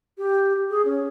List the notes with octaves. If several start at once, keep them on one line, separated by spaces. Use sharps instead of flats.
G4
G#4
C#4